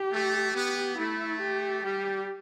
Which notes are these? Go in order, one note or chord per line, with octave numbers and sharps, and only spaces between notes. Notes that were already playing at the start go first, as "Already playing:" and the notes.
Already playing: G4
A3
B3 G4
A3 E4
G4
G3 G4